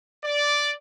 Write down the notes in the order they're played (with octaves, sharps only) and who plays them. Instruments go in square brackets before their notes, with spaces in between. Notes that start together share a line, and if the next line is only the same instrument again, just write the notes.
[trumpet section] D5